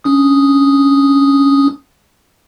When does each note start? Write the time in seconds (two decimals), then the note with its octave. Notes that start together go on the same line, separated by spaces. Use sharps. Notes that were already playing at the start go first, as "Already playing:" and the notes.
0.04 C#4 D4 D#6